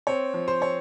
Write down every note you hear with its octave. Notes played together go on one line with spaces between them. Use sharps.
C4 C#5
F3
C5
C4 C#5